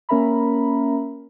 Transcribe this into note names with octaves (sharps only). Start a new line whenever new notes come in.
A#3 C#4 A#4 E5 A#5 B5